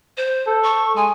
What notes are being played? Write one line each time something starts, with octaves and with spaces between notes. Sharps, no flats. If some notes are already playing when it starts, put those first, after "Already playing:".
C5
A4
C#6
G#3 G#5